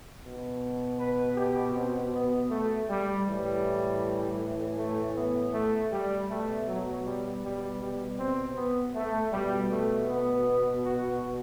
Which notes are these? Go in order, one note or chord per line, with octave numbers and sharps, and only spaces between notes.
B2
B4
G4
C4
B3
A3
G3
A2 E3 G3
A3
B3
A3
G3
B2 A3
F#3
G3
G3
G3
C4
B3
A3
B2 G3
A3
B3
F#4